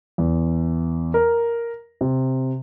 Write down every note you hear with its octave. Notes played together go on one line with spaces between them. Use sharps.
E2
A#4
C3